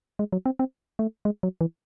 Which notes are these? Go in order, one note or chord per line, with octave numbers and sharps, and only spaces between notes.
G#3
F#3
C4
C4
A3
G#3
F#3
E3